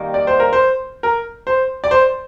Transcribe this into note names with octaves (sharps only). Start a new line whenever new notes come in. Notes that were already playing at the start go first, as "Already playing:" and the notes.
Already playing: D#3 G3 A#3
D5
C5
A#4
C5
A#4
C5
D5
C5